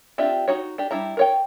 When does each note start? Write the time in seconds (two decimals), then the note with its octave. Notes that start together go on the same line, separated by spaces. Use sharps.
0.18 C4 D4 F4 G4 E5
0.48 D#4 F#4 C#5
0.78 D4 G4
0.91 G3 D4 E4 A#5
1.17 A#4 C#5 G5